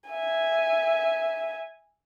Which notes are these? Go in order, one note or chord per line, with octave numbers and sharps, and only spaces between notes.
E5 G#5